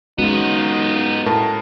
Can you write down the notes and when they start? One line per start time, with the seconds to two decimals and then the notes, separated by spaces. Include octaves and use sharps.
0.19 G#3 B3 C#4 D#4 F4 F#4
1.26 A2 A#4 A5